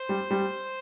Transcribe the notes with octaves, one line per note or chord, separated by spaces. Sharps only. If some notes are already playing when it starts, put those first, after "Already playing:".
Already playing: C5
G3
G3